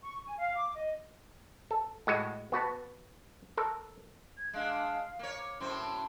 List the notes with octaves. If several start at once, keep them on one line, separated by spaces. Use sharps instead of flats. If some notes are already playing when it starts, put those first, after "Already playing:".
C#6
G#5
F5
D6
D#5
A4
A2 G#3 F#4
B3 F#4 B4 A5
A4 A#4
G#6
G#3 D4 F5
A#3 C#5
F#2 A2 C4 C6